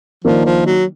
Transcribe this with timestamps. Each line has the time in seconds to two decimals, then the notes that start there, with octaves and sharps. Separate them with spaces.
0.24 D#3 F3 A#3 D4
0.46 F3
0.66 F#3